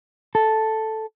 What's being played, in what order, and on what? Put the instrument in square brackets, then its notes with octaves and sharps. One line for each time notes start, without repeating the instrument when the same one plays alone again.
[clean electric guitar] A4